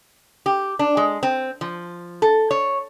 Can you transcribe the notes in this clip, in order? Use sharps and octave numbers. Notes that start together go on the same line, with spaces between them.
G4
D4
G#3
C4
F3
A4
C#5